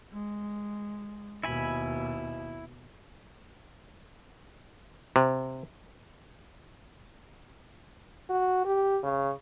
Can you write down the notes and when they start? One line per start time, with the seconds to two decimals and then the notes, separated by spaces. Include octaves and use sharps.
0.14 G#3
1.44 D#2 B2 E4 G#5 B5
5.16 C3
8.30 F#4
8.65 G4
9.03 C#3